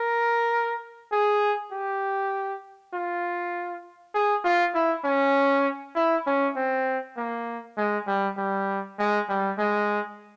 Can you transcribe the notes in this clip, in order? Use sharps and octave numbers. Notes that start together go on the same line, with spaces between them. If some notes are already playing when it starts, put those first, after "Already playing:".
Already playing: A#4
G#4
G4
F4
G#4
F4
E4
C#4
E4
C#4
C4
A#3
G#3
G3
G3
G#3
G3
G#3